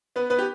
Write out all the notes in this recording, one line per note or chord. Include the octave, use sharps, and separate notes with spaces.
B3 B4
B3 B4
G4